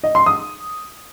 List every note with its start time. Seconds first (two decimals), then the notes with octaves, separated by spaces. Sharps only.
0.04 D#5
0.15 C6
0.26 D#6